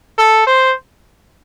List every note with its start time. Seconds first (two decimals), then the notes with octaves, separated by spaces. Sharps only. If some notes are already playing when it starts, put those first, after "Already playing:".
0.18 A4
0.47 C5